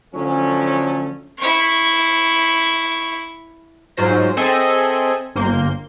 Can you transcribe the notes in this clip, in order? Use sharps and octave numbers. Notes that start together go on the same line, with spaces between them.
D3 F3 F#3 A3 C#4
E4 C#6
G#2 F#3 F4 C5 A#6
C4 G#4 A4 D#5 E5 G#5
G1 A#3 C6 G6